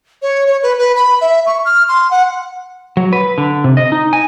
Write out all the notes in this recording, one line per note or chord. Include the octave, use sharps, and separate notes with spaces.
C#5
C#5
B4
B4
B5
E5
C#6
F6
C6
F#5
F#3
B4
D3
C3
D#5
D#4
G#5